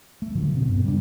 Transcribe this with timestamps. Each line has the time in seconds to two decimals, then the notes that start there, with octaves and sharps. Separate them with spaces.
0.22 A3
0.35 A2 D3 F3 F#3
0.54 B2 C4
0.69 G2 B3
0.84 C#3 G3 G#3 D4